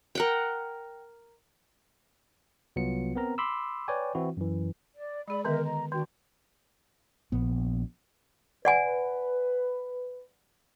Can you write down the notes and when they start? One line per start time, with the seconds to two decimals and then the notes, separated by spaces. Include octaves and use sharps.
0.15 A#4 F#5 G5
2.76 C2 F#3 B3 F4 C#7
3.15 B3 C4 A#4 A#5
3.38 B5 C6 D6 E6
3.88 B4 C#5 D5 G5 G#5
4.15 E3 C4 E4 F#4
4.37 F#2 E3
4.94 D5
5.28 G#3 G#4 D5 B5
5.45 D3 D#3 B3 A#4 D#5 E5
5.62 D#5 A#5
5.92 D#3 D4 F#4 G5
7.32 A#1 B3
8.65 B4 D5 F#5 G#5